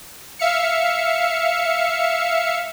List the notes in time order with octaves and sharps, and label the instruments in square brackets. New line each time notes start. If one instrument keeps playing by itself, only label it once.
[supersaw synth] E5 F5 C#7